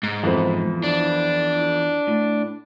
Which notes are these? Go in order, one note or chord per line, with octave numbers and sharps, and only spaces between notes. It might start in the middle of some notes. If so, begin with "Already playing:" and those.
G#2
F2 E3 B3 A4 C5
D4
A2